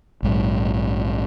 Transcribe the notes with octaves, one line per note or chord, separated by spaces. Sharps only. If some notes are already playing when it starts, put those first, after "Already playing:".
A#1 G#2 F#3